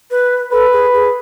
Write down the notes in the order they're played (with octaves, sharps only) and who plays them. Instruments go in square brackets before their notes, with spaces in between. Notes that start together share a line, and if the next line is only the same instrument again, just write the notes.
[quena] B4
[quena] A4 [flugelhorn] B4
[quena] G#4
G#4